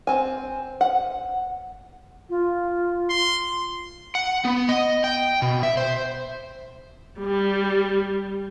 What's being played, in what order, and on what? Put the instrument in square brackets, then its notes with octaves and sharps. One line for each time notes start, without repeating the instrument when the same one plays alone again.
[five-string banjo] C4 G#5
F#5
[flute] F4
[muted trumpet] C6
[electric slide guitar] F#5
B3
D#5
G5
B2
E5
C5
[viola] G3